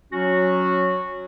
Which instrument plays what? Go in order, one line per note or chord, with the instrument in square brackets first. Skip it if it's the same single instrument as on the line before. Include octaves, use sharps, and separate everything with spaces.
[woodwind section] F#3 C#4 F#4